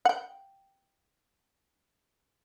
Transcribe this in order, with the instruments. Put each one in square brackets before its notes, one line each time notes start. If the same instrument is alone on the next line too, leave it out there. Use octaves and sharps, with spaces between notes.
[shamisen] F#5 G5